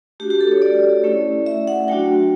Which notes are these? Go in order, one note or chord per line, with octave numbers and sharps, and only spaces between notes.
A3 D4 F#4 G4
G4
A4
C#5
D5
A3 C#4 E4
E5
F#5
F#3 A3 D4 F#4 G5